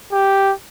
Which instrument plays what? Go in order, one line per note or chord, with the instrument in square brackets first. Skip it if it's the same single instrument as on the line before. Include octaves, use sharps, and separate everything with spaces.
[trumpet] G4